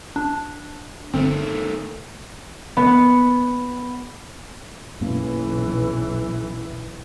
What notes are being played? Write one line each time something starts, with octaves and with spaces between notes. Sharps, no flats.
D4
G1 D#3 A3 C4
B3
B1 F#2 E3 A#3